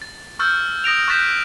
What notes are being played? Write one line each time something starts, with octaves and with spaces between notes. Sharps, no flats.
A6
C#6 E6 F6 G6 A6
D#6 A#6 D7 F7
C#6 F#6 G6 A6 B6 E7